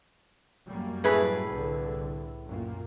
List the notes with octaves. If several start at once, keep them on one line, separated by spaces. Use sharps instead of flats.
F#2 G3 A#3
A2 G#4 B4
C2 D3
F#2 A#2 A#3